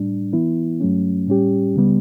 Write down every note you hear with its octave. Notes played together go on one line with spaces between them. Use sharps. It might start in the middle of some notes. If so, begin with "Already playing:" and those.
Already playing: A2 G3 D4
E3 B3 E4
G2 F#3 A3 C#4
A2 G3 C#4 G4
C#2 C#3 G3 B3